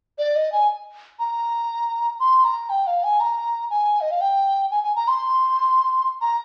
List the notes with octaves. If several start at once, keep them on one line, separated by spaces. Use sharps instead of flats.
D5
D#5
G#5
A#5
C6
A#5
G5
F5
G#5
A#5
G#5
D#5
F5
G5
G#5
G#5
A#5
C6
A#5